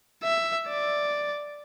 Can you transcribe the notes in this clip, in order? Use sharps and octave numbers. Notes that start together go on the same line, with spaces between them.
E5
D5